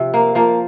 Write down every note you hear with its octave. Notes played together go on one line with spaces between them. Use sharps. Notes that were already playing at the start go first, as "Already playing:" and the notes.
Already playing: C3 F3
A#3
F3 A#3